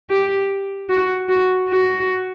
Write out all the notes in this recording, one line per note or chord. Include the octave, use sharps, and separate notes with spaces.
G4
F#4
F#4
F#4